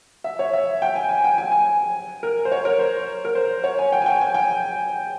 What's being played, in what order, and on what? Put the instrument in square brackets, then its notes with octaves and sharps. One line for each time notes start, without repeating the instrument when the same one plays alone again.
[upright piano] E5
C#5
E5
G5
G#5
G#5
G5
G#5
G#5
A#4
C5
C#5
A#4
C5
A#4
C5
C#5
G#5
G5
G#5
G5
G#5
G5